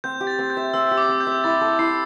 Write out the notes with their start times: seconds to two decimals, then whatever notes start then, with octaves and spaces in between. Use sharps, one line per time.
0.04 C4 G6
0.21 G4
0.27 A6
0.39 C4
0.50 G6
0.57 E5
0.74 C4 E6
0.91 G4
0.97 D6
1.09 C4
1.20 G6
1.27 E5
1.44 E4 A6
1.61 A4
1.79 E4 C7